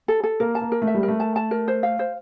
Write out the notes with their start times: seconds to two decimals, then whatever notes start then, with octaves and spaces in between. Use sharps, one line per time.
0.08 A4
0.23 A4
0.40 A#3 A#4
0.55 A5
0.61 A#3
0.72 A#4
0.82 A3
0.87 E5
0.95 G3
1.03 A#4
1.08 A3
1.20 A5
1.36 A5
1.51 A#4
1.68 C5
1.83 F5
1.99 C5